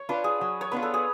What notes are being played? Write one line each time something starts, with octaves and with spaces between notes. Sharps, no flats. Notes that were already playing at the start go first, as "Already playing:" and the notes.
Already playing: C#5
D4 F4 B4
G#4
F#3
C#5
B3 D4 F4 B4
A4
G#4